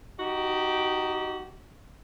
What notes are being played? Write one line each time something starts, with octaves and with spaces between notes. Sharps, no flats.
D#4 F#4 G4